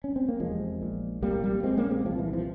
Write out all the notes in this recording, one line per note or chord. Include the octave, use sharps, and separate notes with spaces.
C#4
C4
A#3
F1 E2 C3 F3 G#3
A#1 A#2
C2 A#2 G3 A#3
G3 A#3
A#1 A#2 G#3 C4
A#3 C#4
G#3 C4
C2 A#2 F3
E3
F3